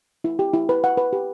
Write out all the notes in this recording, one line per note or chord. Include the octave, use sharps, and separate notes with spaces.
E4
G4
E4
B4
F#5
B4
G4